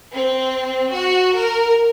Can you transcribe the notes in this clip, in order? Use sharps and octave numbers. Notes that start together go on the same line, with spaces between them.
C4
F#4
A#4